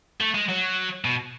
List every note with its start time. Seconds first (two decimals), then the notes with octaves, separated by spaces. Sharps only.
0.21 A3
0.34 G#3
0.49 F#3
1.05 B2